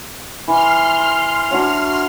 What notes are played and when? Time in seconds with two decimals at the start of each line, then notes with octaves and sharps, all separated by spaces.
0.48 E3 C6 F6
1.51 D4 F#4 C#5